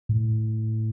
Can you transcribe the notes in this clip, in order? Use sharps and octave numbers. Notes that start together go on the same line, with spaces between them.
A2